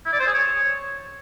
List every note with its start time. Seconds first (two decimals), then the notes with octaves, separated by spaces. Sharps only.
0.06 E4
0.13 D5
0.20 C5
0.27 G#4
0.34 C#5